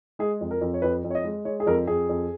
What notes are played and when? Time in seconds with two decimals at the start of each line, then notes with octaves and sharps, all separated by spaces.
0.19 G#3 G#4
0.41 F2
0.51 A#4
0.61 F2
0.74 C#5
0.82 F2 B4
1.04 F2
1.10 C#5
1.15 D#5
1.24 G#3
1.45 G#3 C#5
1.60 G#4
1.66 F2 A#4
1.87 F2 G#4
2.09 F2